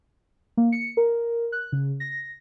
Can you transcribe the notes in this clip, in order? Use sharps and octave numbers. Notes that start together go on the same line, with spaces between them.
A#3
C#7
A#4
F#6
C#3
A#6